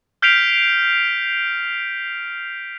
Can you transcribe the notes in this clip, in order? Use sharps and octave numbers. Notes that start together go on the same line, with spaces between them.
F6 G6 B6 C7 D7 F7